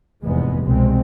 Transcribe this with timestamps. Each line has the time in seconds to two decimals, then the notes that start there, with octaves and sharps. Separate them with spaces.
0.24 F1 E2 G#2 G#3 B3
0.64 C2 B2 G#3 C4